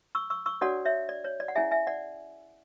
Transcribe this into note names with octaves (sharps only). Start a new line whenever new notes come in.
C#6 E6
C#6 E6
C#6 E6
D4 F#4 A4 C#5 D5 F#5
C#5 E5
D5
C#5
D5
F#5
C#4 E4 G#4 E5 G#5
E5 G#5
D5 F#5